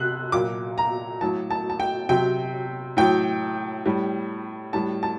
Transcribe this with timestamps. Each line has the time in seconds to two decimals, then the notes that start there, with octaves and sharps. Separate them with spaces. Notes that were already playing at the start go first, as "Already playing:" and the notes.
Already playing: C3 F#6
0.32 A#2 F#3 D6
0.78 A#5
1.21 A2 F#3 A5
1.50 A5
1.70 A5
1.80 G5
2.09 C3 F#3 G5
2.97 A2 F#3 G5
3.86 A2 G3
4.73 A2 G3 A5
5.03 A5